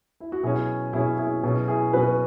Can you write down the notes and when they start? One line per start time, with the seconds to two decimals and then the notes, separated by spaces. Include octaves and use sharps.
0.20 E4
0.32 F#4
0.43 B2 F#3 C#4 E4 G#4
0.93 B2 F#3 C#4 E4 G#4
1.18 E4 G#4
1.43 B2 F#3 C#4 E4 G#4
1.68 E4 G#4
1.93 B2 F#3 C#4 F#4 B4